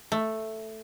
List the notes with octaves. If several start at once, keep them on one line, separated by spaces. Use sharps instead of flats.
A3